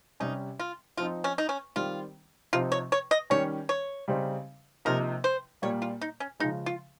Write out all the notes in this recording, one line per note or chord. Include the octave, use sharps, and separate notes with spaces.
C3 G3 C#4 D#4
F4
F3 C4 D#4 F4
C#4
D#4
C#4
D#3 G3 C4 F4
C3 F3 C4 D#4 F4
C#5
C#5
D#5
D#3 G3 C#4 C#5
C#5
C#3 G3 C4 D#4
C3 F3 A#3 D#4 A#4
C5
A#2 G3 A#3 C#5
F4
D#4
C#4
C#3 F3 G#3 D#4
F4